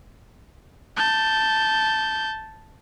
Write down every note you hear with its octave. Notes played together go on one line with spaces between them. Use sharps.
A5 G6